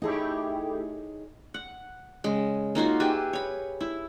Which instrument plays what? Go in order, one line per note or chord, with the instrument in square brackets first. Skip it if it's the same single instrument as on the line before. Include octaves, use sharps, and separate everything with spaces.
[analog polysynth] A3 E4 G4 [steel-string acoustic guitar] D#4 G#4 C#5
[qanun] F#5
C#3 G#3
A#3 D#4 F4 F#4
G4 G#4 B4 E5
C#5 B5
E4